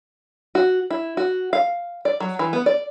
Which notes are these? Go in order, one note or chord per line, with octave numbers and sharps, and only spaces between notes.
F#4
E4
F#4
F5
D5
F#3
E3
B3
D5